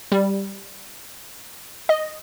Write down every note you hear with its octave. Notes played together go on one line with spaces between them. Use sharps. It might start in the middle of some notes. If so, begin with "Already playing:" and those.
G3
D#5